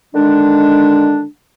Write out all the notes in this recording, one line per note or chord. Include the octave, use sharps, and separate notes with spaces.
D3 D#3 G#3 D4